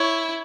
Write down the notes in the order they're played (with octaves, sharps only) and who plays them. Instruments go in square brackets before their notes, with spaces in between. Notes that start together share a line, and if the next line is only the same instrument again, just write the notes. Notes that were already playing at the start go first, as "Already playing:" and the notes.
Already playing: [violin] E4 [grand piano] C#5